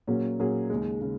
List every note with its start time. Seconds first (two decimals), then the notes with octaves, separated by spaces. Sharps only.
0.07 A#2 F#3 A#3 C#4 G#4
0.40 A#2 F#3 A#3 C#4 G#4
0.70 D#2 C#3 G#3
1.01 C#3 G#3